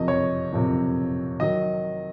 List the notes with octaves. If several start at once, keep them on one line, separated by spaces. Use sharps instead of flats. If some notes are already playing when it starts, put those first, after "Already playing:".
Already playing: F#1 F2 C3 D#5
C#5
F#1 F2 C3
D#3 F#3 D#5